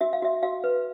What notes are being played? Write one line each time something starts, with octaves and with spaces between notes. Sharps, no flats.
F#4 E5
F5
F#4 E5
F#4 F5
B4